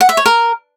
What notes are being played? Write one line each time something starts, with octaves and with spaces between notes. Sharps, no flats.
F#5
E5
C#5
A#4